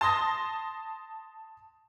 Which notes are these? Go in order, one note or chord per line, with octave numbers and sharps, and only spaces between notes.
A5 C6 D#6 A#6